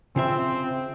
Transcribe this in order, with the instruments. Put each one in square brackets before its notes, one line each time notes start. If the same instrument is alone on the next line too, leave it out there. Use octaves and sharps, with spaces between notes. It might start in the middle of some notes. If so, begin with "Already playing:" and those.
[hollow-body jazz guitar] C#3 F4 E5 [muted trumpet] C4